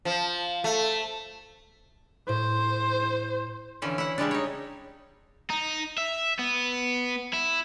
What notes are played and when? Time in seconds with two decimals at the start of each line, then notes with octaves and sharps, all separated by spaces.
0.05 F3
0.64 A3
2.29 A2 C5
3.82 D3 E3 F3 C#4
3.98 E4 F#5
4.18 C#3 G3 G#3 D4
4.31 D#4 C#5
5.50 D#4
5.98 E5
6.39 B3
7.34 E4